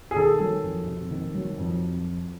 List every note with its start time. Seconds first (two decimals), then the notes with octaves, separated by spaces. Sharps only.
0.11 G#4
0.16 D#3 A4
0.40 F#3
0.63 F2
0.87 C3
1.11 D#3
1.34 F#3
1.58 F2